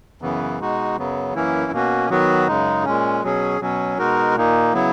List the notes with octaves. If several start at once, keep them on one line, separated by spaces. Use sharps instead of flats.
F#2 C#3 E3 B3
B2 G#3 D#4 F#4
F#2 C#3 F#3 B3
F#2 E3 A#3 C#4 E4
B2 A#3 C#4 F#4
D#3 F#3 B3 F#4
F#2 C#3 G#3 D#4
A#2 G#3 C#4
B2 F#3 C#4 G#4
B2 F#3 C#4
B2 G#3 D#4 F#4 A#4
A#2 A#3 D#4
C#3 F#3 B3 E4